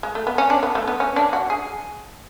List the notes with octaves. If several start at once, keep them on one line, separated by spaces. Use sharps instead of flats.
G#3
A3
B3
C#4
D4
B3
A3
B3
C#4
D4
F#4
G#4